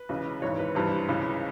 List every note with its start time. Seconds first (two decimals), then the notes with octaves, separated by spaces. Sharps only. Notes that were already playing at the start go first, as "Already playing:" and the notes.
Already playing: B4
0.09 C#2 C#3 E3
0.42 G#1 G#2 E3 C#5
0.59 B4
0.75 G#1 G2 E3
1.08 C#2 C#3 E3